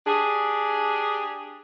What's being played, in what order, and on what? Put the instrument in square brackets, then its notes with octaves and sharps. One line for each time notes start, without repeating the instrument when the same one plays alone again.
[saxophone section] D4 G4 G#4